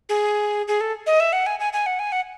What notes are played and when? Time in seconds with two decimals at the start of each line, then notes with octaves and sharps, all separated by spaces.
0.09 G#4
0.68 G#4
0.81 A4
1.06 D#5
1.20 E5
1.33 F#5
1.46 G#5
1.60 G#5
1.73 G#5
1.86 F#5
1.99 G#5
2.12 F#5